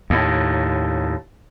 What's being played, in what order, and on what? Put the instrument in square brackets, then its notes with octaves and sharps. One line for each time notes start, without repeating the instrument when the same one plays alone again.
[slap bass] D#2 A2